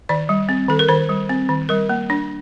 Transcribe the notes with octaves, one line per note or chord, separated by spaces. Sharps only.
D#3 D5
G3
C4
D#3 A4
A#4
D#3 C5
G3
C4
D#3
G3 A#4
A#3
D4